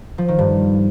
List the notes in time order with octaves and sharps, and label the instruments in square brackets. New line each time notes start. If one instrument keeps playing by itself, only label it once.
[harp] F3
D#3
G2